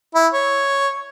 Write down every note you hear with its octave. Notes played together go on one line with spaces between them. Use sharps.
E4
C#5